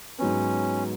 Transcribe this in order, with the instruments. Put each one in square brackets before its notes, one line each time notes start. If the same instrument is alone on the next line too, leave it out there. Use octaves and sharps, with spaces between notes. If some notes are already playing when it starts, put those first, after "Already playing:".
[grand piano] G#2 F#3 B3 [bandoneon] C#4